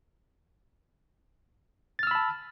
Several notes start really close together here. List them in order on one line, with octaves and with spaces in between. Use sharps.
A6 F6 E6 B5 A5